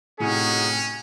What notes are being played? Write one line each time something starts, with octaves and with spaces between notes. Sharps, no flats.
A2 C3 C#4 D#4 F#4 G#4